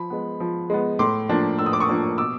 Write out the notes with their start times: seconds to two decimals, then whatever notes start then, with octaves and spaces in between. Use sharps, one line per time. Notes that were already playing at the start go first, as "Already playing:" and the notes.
Already playing: F3 B5
0.10 G#3 B3
0.40 F3
0.70 G#3 B3
0.99 A2 C6 D6
1.29 F3 A#3 D4
1.59 A2 E6
1.66 D#6
1.73 D6
1.80 C#6 D#6
1.89 F3 A#3 D4
2.18 B2 D6 E6